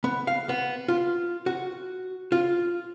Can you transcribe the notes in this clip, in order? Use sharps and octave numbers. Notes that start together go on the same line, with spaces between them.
B3
F5
B3
F4
F#4
F4